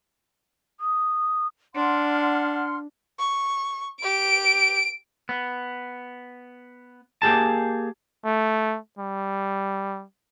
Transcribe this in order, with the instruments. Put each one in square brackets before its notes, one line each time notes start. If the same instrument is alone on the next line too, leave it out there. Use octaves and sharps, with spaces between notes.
[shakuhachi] D#6
[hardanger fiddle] D4 [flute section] F#5 C6 F6
[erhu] C#6
[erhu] G4 [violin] D7
[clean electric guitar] B3
A#3 G4 G#4 A5
[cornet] A3
G3